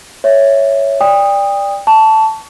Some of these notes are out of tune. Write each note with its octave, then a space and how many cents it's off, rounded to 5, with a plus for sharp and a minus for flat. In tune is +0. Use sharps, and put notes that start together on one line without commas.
C#5 +0 E5 +0
D5 +0 G5 +35 D#6 +0
A5 +0 C#6 +35